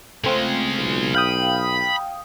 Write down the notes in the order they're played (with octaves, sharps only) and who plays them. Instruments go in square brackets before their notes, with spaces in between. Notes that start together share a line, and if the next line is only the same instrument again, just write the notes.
[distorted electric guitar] C#3 G#3 [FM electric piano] A3 C4 F4
[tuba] B1
[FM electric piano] F5 G5 D#6 [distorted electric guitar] B5